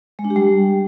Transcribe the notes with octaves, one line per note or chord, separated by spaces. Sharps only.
G#3
D4
G4
G3